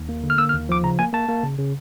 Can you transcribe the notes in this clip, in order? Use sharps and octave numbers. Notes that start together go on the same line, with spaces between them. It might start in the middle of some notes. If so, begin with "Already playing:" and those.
Already playing: D#2
A#3
D3
F6
A#3 E6
F6
D#2
F3 D6
C#3 A#5
A#3 G#5
A#3 A5
A#3
C#3
C#3